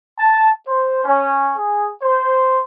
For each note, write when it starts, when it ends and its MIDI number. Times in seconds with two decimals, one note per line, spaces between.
0.18 0.50 81
0.67 1.00 72
1.04 1.52 61
1.57 1.90 68
2.02 2.61 72